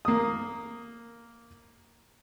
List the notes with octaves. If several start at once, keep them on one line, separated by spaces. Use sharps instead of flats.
A#3 D#6